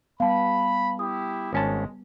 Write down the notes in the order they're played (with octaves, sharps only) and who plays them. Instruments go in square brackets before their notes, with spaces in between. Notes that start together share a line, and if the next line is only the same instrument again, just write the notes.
[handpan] G3 B3 [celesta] F5 A5 [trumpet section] B5
[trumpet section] E4 G4 [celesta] D#6
[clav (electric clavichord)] G#1 C#4 A5 [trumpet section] G#3